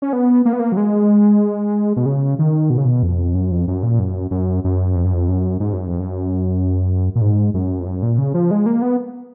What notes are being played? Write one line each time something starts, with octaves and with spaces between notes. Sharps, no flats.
C#4
B3
A#3
B3
A#3
F#3
G#3
B2
C#3
D#3
B2
C#3
B2
F2
F#2
F2
F#2
A#2
F#2
F#2
F#2
F2
F#2
F2
F#2
G#2
F#2
F2
F#2
A#2
G#2
F#2
F2
F#2
A#2
C#3
F3
G#3
A#3
B3